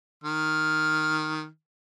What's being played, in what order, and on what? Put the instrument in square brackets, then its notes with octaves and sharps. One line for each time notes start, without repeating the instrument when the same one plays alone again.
[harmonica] D#3 F6